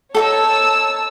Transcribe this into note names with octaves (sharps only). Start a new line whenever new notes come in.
D#4 F#4 A4 C#5 A5 E6